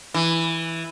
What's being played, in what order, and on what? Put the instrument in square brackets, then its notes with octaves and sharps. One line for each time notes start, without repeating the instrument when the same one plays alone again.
[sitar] E3